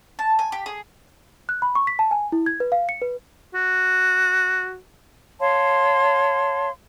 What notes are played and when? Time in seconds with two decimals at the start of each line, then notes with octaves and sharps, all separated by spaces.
0.19 A5
0.39 G#5
0.52 G4
0.66 G#4
1.49 F#6
1.62 B5
1.75 C#6
1.87 B6
1.99 A5
2.11 G#5
2.32 E4
2.46 G#6
2.60 B4
2.72 F5
2.89 C#7
3.02 B4
3.55 F#4
5.40 C#5 F5 A5 C6